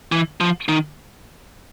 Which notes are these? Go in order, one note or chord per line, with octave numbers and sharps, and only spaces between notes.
E3
F3
D#3